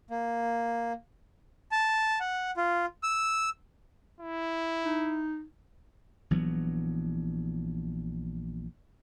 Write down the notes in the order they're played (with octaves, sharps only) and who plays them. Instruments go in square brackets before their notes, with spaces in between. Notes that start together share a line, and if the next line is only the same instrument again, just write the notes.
[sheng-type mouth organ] A#3
A5
F#5
F4
E6
[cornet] E4
[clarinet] D#4
[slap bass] A#1 E3 F#3 B3